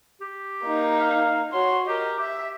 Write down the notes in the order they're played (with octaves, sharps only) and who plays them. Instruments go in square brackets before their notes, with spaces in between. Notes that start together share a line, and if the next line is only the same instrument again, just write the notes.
[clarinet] G4
[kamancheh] A#3 D#4
[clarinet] F5
[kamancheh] F#4 C#5 [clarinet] C6
[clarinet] G4 [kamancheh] A#4 D#5
[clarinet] G4 [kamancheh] E5